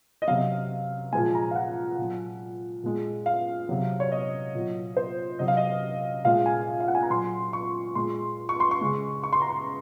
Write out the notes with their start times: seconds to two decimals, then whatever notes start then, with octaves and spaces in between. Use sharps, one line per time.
0.22 D#5
0.28 C3 F#3 F5
1.13 A#2 F3 G#3 G#5
1.35 A#5
1.51 F5
1.55 F#5
1.98 A#2 F#3
2.84 A#2 G#3
3.26 F5
3.69 C3 F#3
4.00 C#5
4.12 D#5
4.55 A#2 F#3
4.97 C5
5.39 C3 F#3 D#5
5.48 F5
5.57 D#5
6.25 A#2 G#3 F5
6.46 G#5
6.80 F5
6.88 F#5
6.95 G#5
7.03 A#5
7.10 A#2 F#3 C6
7.53 C#6
7.95 A#2 G#3 C6
8.49 C#6
8.60 C6
8.71 C#6
8.81 C#3 G#3
9.23 C#6
9.33 C6
9.42 A#5
9.50 C6